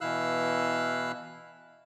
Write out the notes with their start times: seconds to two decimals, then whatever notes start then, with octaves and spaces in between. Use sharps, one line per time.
0.01 B2 E3 E4 F5 E6 F#6